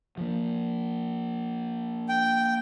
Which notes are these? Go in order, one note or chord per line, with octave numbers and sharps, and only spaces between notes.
F3 A#3
G5